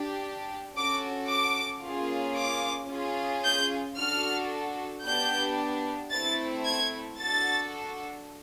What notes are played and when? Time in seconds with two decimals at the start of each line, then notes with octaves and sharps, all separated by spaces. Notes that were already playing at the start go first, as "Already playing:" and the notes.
Already playing: D4 G4
0.76 C#4 F#4 A4 D6
1.30 D6
1.84 A#3 C#4 F4 G#4
2.37 D6
2.90 C#4 F4 G#4
3.44 G6
3.98 D4 F#4 A4 F6
5.04 B3 D4 G4 G6
6.11 A3 C4 E4 A4 A6
6.65 G#6
7.18 D4 F#4 A4 A6